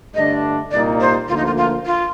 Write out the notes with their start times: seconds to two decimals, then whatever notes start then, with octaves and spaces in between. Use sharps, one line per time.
0.14 G2 D3 A3 D4 D#5
0.71 C2 A#2 G3 A#3 D#4 D5
1.00 C5
1.28 D2 D3 F3 A#3 F4
1.37 D#4
1.46 F4
1.57 F4
1.86 F4